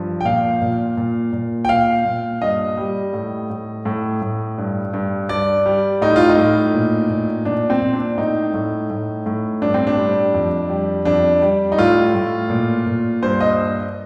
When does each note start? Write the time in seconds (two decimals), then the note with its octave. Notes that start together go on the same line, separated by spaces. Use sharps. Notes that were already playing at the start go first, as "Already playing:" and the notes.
Already playing: G2 F3
0.21 G5
0.25 A#2 F5
0.62 A#2
0.97 A#2
1.33 A#2
1.65 G5
1.69 A#2 F5
2.05 A#2
2.41 G2 D#5
2.77 G3
3.13 A2
3.50 A2
3.85 A2
4.22 A2
4.58 G2
4.93 G2
5.29 G2 D5
5.66 G3
6.02 A2 D#4
6.16 F4
6.29 D#4
6.38 A2
6.74 A#2
7.10 A#2
7.45 A#2 D4
7.70 C4
7.81 A#2
7.94 D4
8.18 A2 D#4
8.54 A2
8.90 A2
9.26 A2
9.62 G2 D4
9.74 C4
9.87 D4
9.98 G3
10.34 F2
10.70 G3
11.05 F2 D4
11.42 G3
11.72 D#4
11.78 A2 F4
12.15 A2
12.50 A#2
12.86 A#2
13.22 G2 C5
13.40 D#5